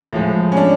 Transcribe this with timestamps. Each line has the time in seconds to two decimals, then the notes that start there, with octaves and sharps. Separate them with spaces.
0.13 A2 F3 G#3
0.52 C#4
0.57 D4